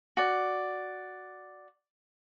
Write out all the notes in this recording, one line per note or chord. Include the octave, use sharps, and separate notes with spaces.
F#4 D5